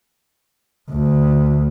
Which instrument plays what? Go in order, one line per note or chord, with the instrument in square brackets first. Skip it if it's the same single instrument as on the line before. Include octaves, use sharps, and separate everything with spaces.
[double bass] D2